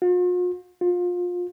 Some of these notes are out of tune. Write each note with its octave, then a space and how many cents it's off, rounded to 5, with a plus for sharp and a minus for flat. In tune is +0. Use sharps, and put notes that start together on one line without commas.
F4 +45
F4 +25